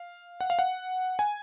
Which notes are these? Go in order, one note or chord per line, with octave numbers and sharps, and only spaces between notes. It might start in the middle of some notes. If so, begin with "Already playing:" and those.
Already playing: F5
F#5
F5
F#5
G#5